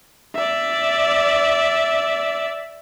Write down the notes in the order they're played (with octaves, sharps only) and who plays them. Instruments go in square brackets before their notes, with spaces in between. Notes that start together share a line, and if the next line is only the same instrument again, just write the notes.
[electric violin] D5 E5